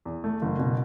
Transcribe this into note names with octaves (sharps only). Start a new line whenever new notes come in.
E2
A3
F#1
B2